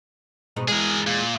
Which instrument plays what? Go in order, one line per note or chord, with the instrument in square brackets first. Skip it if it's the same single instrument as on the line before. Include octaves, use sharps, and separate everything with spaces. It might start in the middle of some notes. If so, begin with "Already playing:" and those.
[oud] G#2 B2 D#4
[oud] E2 G#3 [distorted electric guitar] G#4 A#4
[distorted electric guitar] A#2